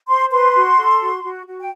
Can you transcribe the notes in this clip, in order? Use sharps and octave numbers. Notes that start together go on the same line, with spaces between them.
C5 C6
B4 C6
F#4
A4
F#4
F#4
F#4
G5